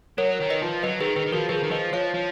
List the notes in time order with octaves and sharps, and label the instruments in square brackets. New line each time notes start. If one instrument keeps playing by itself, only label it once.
[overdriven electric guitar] F#3 [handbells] A#4 C#5
[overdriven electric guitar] D#3
[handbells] B4 D#5
[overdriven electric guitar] F3
[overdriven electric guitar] F#3 [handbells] B4 D#5
[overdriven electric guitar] D#3 [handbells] G#4 B4
[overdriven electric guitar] D#3 [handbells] G#4 B4
[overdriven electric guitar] D#3
[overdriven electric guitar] F3 [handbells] F#4 A#4
[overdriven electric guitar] F3 [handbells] G#4 B4
[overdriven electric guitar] D#3
[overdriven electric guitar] F3 [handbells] B4 D#5
[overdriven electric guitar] F3 [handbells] C#5 F5
[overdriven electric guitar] F3